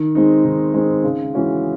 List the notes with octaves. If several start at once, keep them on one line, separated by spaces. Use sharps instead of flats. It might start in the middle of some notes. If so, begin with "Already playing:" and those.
Already playing: D#3
G#3 C4 D#4
D#3
G#3 C4 D#4
C#3
E3 G#3 C#4 F#4